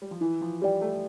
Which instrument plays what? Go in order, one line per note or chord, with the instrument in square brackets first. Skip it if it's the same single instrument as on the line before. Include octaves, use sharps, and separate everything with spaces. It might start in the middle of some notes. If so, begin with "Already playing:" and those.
[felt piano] G3
F3
[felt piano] E3 [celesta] E4
[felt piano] F3
[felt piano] G3 [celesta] G4 D5 G5
[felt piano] A3